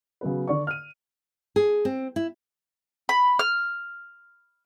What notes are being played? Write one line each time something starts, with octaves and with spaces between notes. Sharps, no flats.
C#3 F#3 B3 B4
D3 D5 C#6
F6 D#7
G#4
C4
E4
B5
F6